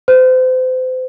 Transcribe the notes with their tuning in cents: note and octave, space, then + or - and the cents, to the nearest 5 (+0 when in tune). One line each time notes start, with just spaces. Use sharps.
C5 -35